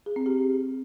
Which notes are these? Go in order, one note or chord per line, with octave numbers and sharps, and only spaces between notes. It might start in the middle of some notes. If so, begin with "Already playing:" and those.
G#4
C4
G4